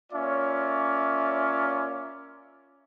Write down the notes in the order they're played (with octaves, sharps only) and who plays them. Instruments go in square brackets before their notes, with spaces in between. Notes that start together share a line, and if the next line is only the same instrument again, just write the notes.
[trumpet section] A#3 C#4 F4 C#5 D5 E5